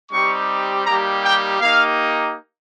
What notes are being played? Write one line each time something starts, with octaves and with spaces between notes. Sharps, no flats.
G3 C4 D#4 G4 C#6
G3 A#3 D#4 G4 A#5
G5
A#3 D#4 G4 F5